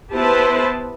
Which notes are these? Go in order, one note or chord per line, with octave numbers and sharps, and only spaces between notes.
B3 E4 G4 B4 C5 A5